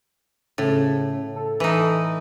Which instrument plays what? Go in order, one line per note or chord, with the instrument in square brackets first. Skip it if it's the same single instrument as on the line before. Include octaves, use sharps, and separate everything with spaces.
[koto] A2 [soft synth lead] C#3
[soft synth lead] A4
[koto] E3 D#4